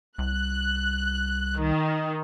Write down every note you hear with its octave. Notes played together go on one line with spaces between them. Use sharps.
C2 F#6
D#3